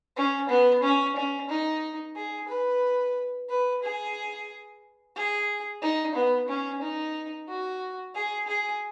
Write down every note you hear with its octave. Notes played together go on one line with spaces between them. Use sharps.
C#4
B3
C#4
C#4
D#4
G#4
B4
B4
G#4
G#4
D#4
B3
C#4
D#4
F#4
G#4
G#4